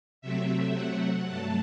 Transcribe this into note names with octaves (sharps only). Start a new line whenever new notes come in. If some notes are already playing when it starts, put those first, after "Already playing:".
C3 F#3 A3 C4 E5
F#5
G2 F#3 A3 A5